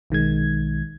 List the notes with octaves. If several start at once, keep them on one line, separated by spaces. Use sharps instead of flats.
B1 D#3 G#3 G#6